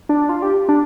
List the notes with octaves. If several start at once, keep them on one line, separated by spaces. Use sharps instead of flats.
D4
F4
G4
D4